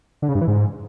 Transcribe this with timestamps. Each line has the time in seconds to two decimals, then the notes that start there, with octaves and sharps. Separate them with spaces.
0.22 D3
0.29 C#3
0.35 G2
0.41 E3
0.48 G#2